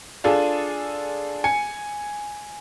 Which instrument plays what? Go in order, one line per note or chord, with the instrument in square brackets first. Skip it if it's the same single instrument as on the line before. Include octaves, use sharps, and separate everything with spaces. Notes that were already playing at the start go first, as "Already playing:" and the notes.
[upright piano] D4 F4 G#4 A4
G#5 C#7